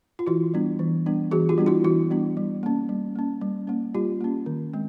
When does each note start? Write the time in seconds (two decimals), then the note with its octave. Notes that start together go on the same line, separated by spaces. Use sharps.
0.19 F4
0.27 E3 E4 F#4
0.54 G3 B3 D4
0.79 E3
1.06 G3 B3 D4
1.31 E3 F#4 G#4
1.49 F4 G4
1.58 G3 B3 D4
1.66 E4 F#4
1.84 E3 E4 F#4
2.11 G3 B3 D4
2.37 G3
2.63 A#3 C#4
2.89 G3
3.16 A#3 C#4
3.41 G3
3.67 A#3 C#4
3.94 G3 F4 G4
4.21 A#3 C#4
4.46 D#3
4.73 G#3 C4